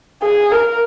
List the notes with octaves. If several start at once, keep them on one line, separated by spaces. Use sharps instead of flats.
G#4
A#4